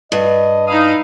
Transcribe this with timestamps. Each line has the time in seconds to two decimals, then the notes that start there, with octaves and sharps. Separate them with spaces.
0.12 G2 D#5
0.68 D#4 E4 F5 D#6